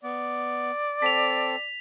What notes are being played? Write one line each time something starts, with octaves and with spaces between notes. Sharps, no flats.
B3 D5
C4 A4 A5 B6 F7